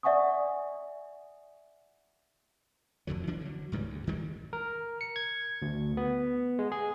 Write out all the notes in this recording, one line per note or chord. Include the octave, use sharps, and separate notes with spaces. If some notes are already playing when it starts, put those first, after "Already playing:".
D5 E5 F#5 G#5 C#6 D#6
F1 F2 D3 F#3
E3 D4
D3 F#3
C#2 G#2 E3 G3
D2
D#3 E3 G3 G#3
A#4
C#7
G#6
D2
B3
G#3
G#4